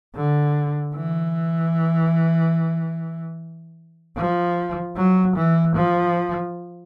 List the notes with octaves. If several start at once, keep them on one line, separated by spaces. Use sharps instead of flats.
D3
E3
F3
F#3
E3
F3